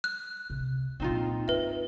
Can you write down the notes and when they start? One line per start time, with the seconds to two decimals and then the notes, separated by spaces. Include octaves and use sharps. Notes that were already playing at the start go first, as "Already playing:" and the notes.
0.04 F#6
0.50 C3
1.00 A#2 A#3 C4 D#4 F4
1.48 G2 B4 E5